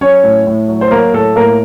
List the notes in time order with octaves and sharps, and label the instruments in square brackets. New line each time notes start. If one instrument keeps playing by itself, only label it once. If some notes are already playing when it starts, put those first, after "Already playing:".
[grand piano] F#3 C#4 C#5
A2
A2
F#3
C5
F#3 A#3 A#4
A2 A4
A2 A#3 A#4